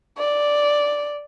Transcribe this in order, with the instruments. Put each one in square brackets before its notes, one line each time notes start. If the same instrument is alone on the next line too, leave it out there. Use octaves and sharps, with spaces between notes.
[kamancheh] D5